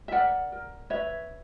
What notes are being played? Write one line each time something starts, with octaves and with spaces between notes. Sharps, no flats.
E5
A#4 D5 F#5
A#4
B4 C#5 E5